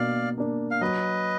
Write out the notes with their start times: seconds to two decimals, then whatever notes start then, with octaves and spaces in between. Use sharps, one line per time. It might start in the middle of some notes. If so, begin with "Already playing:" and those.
Already playing: B2 A#3 D4 D5 F5
0.38 A#3 D4
0.71 F5
0.81 F#3 B4 D#5